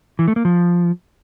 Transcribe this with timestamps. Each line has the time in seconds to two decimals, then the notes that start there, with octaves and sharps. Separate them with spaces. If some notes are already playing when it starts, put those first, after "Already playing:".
0.19 E3
0.28 A3
0.36 A#3
0.45 F3